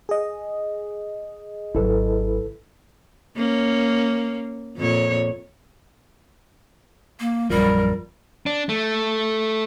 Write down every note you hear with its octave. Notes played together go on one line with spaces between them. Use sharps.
G#4 D#5
G#1 F#3 E4 A4 B4
A#3 C#4
F2 A#2 C#5
A#3
A#1 F#2 F3 G3 A#4
D4
A3